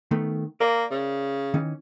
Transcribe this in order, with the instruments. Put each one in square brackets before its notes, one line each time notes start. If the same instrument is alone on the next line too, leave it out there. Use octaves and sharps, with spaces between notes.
[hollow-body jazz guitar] D#3 A3 B3
[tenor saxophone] A#3 [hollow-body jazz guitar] A#4 D5
[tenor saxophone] C#3
[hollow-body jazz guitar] D#3 E3 C#4